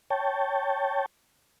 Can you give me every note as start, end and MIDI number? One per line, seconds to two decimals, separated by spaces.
0.10 1.06 73
0.10 1.06 79
0.10 1.06 81